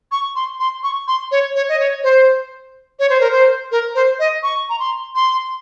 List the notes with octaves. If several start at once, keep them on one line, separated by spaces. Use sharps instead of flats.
C#6
C6
C6
C#6
C6
C#5
C#5
D#5
C#5
C5
C#5
C5
A#4
C5
A#4
C5
D#5
C#6
A#5
C6
C6